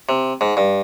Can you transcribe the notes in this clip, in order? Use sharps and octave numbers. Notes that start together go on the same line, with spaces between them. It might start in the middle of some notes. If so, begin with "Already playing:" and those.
C3
G#2
G2